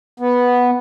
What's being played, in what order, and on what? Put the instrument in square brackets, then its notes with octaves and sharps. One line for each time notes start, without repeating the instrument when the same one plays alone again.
[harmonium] B3